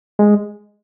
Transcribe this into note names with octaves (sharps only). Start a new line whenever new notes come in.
G#3